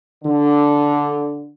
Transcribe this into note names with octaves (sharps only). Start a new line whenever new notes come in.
D3